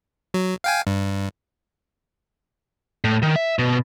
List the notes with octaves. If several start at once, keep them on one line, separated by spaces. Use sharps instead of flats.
F#3
F5 G5 G#5
G2
A2
D#3
E5
B2